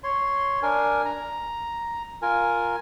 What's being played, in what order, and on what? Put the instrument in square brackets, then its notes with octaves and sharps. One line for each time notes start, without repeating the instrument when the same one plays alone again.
[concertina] C#5 C6
D4 A#4 G#5
A#5
F4 A#4 G#5